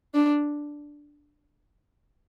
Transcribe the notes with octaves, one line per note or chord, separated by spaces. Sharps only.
D4